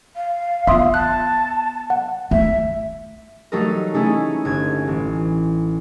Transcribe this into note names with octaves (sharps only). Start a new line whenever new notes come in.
F5
B3 F4 E5 C6 D#6
A5 F#6
F#5
A3 E5
F#3 G3 A3 D#4 A#4
G#3 A3 C#4 D#4 E4 G#4
G1 G#6
A1